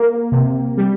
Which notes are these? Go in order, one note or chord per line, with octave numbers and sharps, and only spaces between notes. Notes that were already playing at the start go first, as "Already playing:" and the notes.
Already playing: A#3
C3
G3